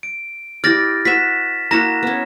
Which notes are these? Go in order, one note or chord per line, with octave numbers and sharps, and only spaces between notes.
D7
E4 G4 D5 F6 A6 A#6
F#4 B4 E5 B6 E7
A#3 E4 F#4 A#5 A#6 E7
B3 C#4